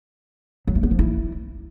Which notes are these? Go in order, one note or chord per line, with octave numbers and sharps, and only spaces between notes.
F#3
A3
B3
F3
E4